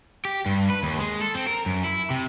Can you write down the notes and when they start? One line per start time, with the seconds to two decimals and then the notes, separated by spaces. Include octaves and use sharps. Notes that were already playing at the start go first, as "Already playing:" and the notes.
0.25 G4
0.46 G2
0.70 B4
0.83 D#2
0.99 G#3
1.21 A4
1.35 C4
1.47 A#4
1.66 F#2
1.84 E4
2.10 C3